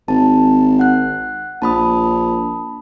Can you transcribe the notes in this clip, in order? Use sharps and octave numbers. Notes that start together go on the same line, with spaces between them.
G#1 A5
F#5 F#6
A#1 A5 B5 D#6